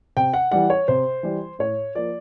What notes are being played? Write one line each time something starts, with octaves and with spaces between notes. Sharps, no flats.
C3 G5
F#5
E3 G3 F#5
C#5
C3 C5
E3 G3
A2 C#5
F3 A#3 D5